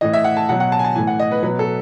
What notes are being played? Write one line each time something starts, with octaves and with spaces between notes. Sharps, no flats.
A2 E3 D#5
E5
F#5
A5
B2 F#3 F#5
F#5
A5
G#5
A5
A2 E3 G#5
F#5
D#5
B4
B2 F#3 B4
A4